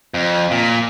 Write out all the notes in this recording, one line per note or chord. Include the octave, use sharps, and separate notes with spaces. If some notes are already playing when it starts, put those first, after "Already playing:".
F2
A#2